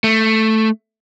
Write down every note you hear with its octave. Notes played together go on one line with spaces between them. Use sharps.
A3